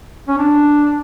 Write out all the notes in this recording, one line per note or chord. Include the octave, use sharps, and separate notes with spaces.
C#4
D4